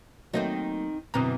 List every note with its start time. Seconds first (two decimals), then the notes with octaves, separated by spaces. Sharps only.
0.34 D#3 F#3 A3 A#3 C4 D#4
1.14 F#2 B2 D3 E3 C4 A#5 D#6